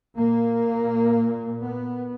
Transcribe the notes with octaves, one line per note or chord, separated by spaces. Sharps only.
A#2 A#3
B3